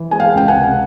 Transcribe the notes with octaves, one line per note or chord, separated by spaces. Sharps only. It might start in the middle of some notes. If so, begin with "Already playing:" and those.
Already playing: E3
G#3 G#5
F5 G5
C#2 G5
F#5 G#5
C3